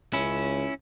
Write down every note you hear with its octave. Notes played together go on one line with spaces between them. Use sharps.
C#2 C#4 E4